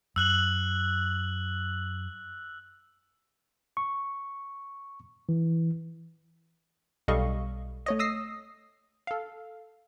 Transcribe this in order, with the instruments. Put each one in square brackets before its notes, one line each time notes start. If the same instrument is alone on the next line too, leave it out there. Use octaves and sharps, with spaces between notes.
[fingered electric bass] F#2 [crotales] E6 F#6 F#7
[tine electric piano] C#6
E3
[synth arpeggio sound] B1 G3 A4 D#5 F5 C#6
A3 C#5 D#5
D#6 E6 A#6 C7
A4 F5